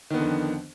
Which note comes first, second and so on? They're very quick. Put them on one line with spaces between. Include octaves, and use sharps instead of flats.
D#3 B3 D3 F2